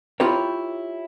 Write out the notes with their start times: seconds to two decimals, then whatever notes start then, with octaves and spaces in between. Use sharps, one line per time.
0.20 E4 F4 G4 A#4 C#5